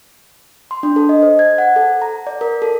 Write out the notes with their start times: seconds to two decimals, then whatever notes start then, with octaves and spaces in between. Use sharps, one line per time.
0.71 C6
0.83 D4
0.96 A4
1.09 D#5
1.22 C5
1.39 G#6
1.58 F#5
1.76 A4
2.02 A#5
2.27 D5
2.41 A#4
2.62 A4